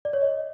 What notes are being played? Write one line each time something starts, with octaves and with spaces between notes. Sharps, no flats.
D5
C#5
D#5